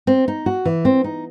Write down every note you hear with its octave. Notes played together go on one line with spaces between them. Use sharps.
C4
D#4
F#4
E3
C4
D#4